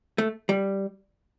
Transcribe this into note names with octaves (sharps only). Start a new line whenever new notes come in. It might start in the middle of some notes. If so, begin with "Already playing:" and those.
A3
G3